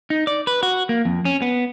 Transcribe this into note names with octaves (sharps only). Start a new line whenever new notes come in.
D#4
D5
B4
F#4
A#3
F2
C#4
B3